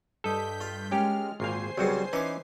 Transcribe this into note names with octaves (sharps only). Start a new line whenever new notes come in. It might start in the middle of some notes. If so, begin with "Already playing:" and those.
G2 A4 D#5 G6 B6
F4
G#3 C#4 G4 A#4 F6
G#1 A#2 C5 F5 G#5 C7
C2 G2 C#3 F#3 G3 F#4
E3 C#4 D#4 B4 D6